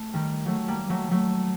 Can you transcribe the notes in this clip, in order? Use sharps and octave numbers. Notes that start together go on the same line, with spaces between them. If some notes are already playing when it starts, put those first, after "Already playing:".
Already playing: A3
D#3 G3
F#3 A3
G3 A#3
F#3 A3
F#3 A3